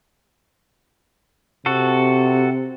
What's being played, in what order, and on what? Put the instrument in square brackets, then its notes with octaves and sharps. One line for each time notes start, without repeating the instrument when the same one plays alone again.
[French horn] C3 [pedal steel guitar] F#4 A4